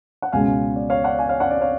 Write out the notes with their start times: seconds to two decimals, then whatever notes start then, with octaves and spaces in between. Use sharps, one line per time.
0.22 F#5
0.32 C#2 B2 G#3 C#4 F5 G#5
0.76 D5
0.90 C#5 F5
1.04 D5 F#5
1.19 F5 G#5
1.29 C#5 F5
1.40 D5 F#5
1.51 D5
1.60 C#5 F5